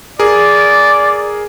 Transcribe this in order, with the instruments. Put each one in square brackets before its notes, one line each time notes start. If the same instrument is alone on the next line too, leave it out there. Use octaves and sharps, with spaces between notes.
[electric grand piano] G#4 A#4 [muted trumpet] D5